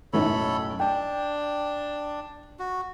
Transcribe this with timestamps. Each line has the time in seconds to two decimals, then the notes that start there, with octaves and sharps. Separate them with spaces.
0.13 B1 F#2 A2 A4 C#5 B5
0.80 D4 G5
2.59 F#4